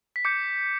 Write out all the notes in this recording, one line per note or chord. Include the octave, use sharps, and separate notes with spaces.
B6
D6 G6 C#7